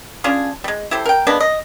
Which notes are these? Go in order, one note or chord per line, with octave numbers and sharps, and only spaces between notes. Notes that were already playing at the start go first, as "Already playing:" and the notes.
C#4 D4 F4 G#4
G3 G#3
E4 G4 A4 C5
A#4 G5
G#3 A#3 B3 D4
D#5